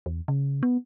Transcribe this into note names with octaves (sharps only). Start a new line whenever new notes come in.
E2
C#3
B3